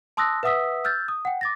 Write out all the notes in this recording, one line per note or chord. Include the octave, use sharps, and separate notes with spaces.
A5 C6 D#6 E6 F#6 A#6
B4 E5 F#5 D#6 E6 B6
E6 F6 G6 A6
D#6
F#5 G5
D6 A6 A#6